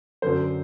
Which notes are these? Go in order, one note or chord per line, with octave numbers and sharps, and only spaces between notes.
F#2 D3 F#3 C5